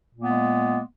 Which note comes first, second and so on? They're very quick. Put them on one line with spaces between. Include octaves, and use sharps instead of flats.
A#2 A#3 B3 G#3